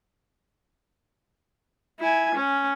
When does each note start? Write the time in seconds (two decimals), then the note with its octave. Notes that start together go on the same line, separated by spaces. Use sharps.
2.00 E4 G#5
2.35 C#4